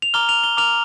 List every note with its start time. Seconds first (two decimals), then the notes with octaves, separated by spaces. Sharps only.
0.02 F7
0.14 A#5 D6 F6 G7
0.29 F7
0.44 G7
0.57 A#5 D6 F6 F7